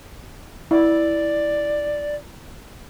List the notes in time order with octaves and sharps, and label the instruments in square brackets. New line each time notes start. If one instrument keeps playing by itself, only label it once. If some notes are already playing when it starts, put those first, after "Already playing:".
[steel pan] E4 [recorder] D5